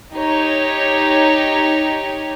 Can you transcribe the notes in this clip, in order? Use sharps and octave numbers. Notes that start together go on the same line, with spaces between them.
D#4 G4 C#5